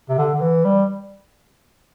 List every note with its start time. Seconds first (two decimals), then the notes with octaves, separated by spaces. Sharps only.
0.09 C3
0.18 D3
0.34 D3
0.41 E3
0.65 G3